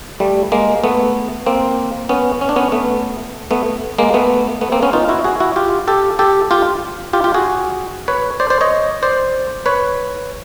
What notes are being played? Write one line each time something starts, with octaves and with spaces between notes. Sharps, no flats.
G3 A3
G#3 A#3
A3 B3
A#3 C4
B3 C#4
C#4
D4
B3 C#4
A3 B3
A3 B3
G#3 A#3
A3 B3
A3 B3
A#3 C4
B3 C#4
D#4 F4
E4 F#4
F#4 G#4
E4 F#4
F4 G4
G4 A4
G4 A4
F4 G4
F4 G4
F4 G4
F#4 G#4
B4 C#5
C5 D5
C5 D5
C#5 D#5
C5 D5
B4 C#5